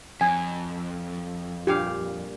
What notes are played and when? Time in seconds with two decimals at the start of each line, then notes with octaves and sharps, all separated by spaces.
0.21 F2 G#5
1.67 G2 A#2 G4 F5